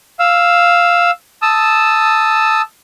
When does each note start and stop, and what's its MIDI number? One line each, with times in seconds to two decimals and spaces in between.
0.19 1.11 77
0.19 1.11 88
1.42 2.62 81
1.42 2.62 87
1.42 2.62 88